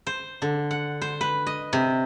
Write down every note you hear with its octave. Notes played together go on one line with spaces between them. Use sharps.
C5
D3
F#5
C5
B4
D#5
C3